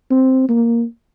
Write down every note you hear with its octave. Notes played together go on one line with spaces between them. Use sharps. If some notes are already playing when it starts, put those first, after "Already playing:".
C4
A#3